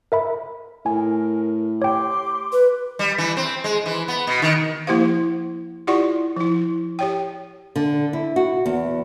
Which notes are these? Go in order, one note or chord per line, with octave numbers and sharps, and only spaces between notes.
A#4 E5 B5
A2 A#4 G#5
G4 C#5 G5 C6 D6
B4
G3
E3
C4
G#3
E3
B3
B2
D#3
F3 A#3 E4 G4 C5 F5
E4 F4 G4 D5 F#5 C#6
F3 E4
G4 C#5 G5
D3
E4
F#4
E2